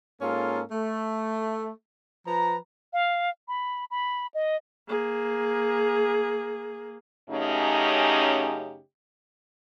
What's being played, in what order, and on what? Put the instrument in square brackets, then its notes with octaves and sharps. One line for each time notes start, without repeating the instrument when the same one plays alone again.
[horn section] G#2 A#3 C#4 F4 A4
A3
F3 B4 A#5
[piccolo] F5
B5
B5
D#5
[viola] A#3 G#4
[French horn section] F#2 C#3 A3 C#4 D#4 G4